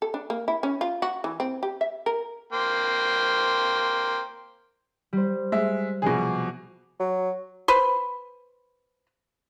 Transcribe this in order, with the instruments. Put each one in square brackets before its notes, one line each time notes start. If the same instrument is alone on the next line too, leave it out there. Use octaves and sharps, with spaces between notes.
[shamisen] A4
D4
A#3
E4
C#4
F4
F#4
E3
C4
G4
E5
A#4
[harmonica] A#3 C5 G5
[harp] G3 C5
[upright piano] G#3 E5
[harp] C2 F3 D6 [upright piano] B2 G#4
[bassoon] F#3
[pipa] B4 C5